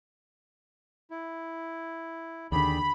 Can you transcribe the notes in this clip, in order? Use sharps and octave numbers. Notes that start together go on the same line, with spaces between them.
E4
D#2 D3 G4 G#4 D5 B5